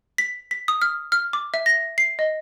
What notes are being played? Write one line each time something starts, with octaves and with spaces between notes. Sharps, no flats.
B6
B6
D#6
F6
F6
D6
E5
A#6
C7
D#5